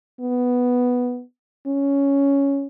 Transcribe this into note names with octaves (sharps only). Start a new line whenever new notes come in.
B3
C#4